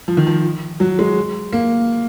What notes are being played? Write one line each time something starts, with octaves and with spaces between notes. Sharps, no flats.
F3
D#3
F3
F#3
G#3
A#3